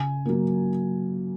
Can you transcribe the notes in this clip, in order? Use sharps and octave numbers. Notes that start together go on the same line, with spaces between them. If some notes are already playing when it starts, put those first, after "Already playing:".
Already playing: C#3 G#5
F#3 A#3